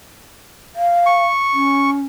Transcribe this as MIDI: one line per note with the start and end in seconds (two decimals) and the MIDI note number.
0.76 1.25 77
1.06 1.90 85
1.53 2.05 61